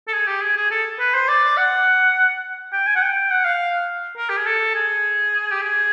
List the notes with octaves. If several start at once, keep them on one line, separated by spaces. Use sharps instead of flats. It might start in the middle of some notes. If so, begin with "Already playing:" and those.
A4
G#4
G4
G#4
G#4
A4
B4
C5
D5
F#5
G5
G#5
F#5
G5
F#5
F5
A#4
G4
G#4
A4
G#4
G4
G#4